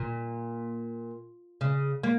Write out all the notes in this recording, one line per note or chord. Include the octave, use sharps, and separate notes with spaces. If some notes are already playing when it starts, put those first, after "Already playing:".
Already playing: A#2
C#3
A#3